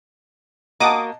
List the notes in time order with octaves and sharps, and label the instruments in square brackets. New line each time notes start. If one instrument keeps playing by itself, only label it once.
[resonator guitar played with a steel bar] A#3 F#4 [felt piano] D#5 F#5 A5 [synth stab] D6 D#6